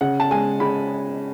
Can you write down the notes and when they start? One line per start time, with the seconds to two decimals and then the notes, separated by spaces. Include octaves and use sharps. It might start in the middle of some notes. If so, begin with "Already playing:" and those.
0.01 C#3 F#5
0.20 A5
0.31 G#3 G#5
0.60 C#3 B5